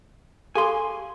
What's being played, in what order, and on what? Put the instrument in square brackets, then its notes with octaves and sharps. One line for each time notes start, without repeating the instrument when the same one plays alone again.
[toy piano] G4 A4 F5 [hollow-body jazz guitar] G#5 C6